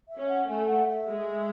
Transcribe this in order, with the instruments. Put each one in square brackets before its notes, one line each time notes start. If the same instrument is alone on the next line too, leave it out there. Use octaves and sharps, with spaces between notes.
[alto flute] E5
[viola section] C#4
[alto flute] F#5
[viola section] A3 [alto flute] G#5
[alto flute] F#5
E5
[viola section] G#3